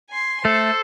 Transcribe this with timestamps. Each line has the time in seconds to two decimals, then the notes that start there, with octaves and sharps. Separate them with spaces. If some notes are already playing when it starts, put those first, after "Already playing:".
0.10 G#5 C6
0.45 A3 A4 C5